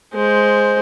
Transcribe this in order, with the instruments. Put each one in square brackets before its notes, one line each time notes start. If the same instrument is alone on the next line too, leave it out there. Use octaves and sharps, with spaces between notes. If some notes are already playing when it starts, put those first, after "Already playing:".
[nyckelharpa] G#3 C5